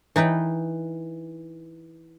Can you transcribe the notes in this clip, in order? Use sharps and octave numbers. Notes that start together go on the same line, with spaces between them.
E3 D#4 B4 G5